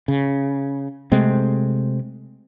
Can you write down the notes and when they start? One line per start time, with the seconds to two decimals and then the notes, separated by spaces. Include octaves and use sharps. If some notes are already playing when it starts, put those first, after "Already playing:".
0.08 C#3
1.12 C3 G#3 A3 C4